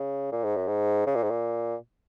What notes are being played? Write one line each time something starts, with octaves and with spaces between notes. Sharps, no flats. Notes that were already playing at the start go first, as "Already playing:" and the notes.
Already playing: C#3
A#2
G#2
F#2
G#2
C#3
A#2
G#2
A#2